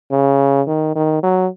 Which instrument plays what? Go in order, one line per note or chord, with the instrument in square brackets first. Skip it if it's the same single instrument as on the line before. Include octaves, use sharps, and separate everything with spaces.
[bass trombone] C#3
D#3
D#3
F#3